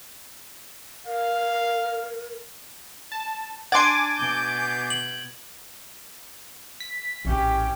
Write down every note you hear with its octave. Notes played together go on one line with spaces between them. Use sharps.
A#4 F5
A5
D4 F#5 G#5 C6 D6 G#6 A6 D7
B2 G6
F#7
B6
A#1 A2 C#4 G4